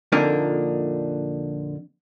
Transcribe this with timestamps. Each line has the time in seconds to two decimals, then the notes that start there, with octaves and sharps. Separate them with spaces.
0.12 F2 A#2 D3 A#3 D4 D#4